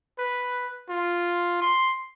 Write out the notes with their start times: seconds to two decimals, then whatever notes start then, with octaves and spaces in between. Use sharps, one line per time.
0.19 B4
0.89 F4
1.62 C6